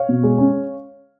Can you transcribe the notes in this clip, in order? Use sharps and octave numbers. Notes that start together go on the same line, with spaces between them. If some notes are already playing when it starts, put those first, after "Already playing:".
Already playing: C#5 F5
B2
G#3
C#4